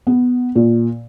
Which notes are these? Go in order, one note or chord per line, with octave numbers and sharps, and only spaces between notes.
B3
A#2